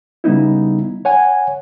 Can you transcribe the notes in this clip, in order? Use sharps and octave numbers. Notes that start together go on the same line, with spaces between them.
C#3 G3 B3 D#4 E4
C#5 F#5 G#5